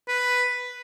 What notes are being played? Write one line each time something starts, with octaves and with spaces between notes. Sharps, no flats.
B4